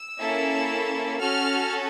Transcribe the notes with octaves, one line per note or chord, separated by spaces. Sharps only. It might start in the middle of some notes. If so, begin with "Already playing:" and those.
Already playing: E6
A#3 C#4 E4 A4
C#4 F#4 A4 F6